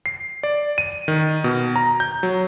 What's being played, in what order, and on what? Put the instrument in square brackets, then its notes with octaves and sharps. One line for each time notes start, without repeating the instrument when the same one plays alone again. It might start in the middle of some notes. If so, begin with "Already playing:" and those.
[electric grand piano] C7
D5
D#7
D#3
B2
A#5
G6
F#3